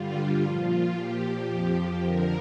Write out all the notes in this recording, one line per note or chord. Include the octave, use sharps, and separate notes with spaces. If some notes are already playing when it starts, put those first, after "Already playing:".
Already playing: G2 D3 G3 F4
A#2 F3
A#2 F3 G4
F2 F3
F2 D3 F3 A#4